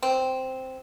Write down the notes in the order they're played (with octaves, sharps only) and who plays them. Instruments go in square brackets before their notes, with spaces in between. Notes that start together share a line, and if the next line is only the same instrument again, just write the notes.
[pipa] C4